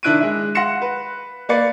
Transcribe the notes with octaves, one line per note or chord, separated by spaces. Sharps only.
D#3 D4 E4 F#6 D7 D#7
G#3 E5
F5 F#5 C6 A#6 C#7 E7
B4
A#3 B4 D5 A6 C#7